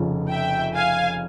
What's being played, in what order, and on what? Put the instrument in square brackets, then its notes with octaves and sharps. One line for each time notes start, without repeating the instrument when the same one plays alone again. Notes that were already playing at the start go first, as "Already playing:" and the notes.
Already playing: [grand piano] F1 F2 C#3 F3
[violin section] E5 G5
F5 G#5